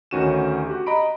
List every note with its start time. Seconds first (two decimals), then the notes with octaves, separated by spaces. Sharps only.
0.11 D2 D#3 C#4 F#4 D#7 E7
0.66 F#4 G4
0.86 D#5 A#5 B5 D7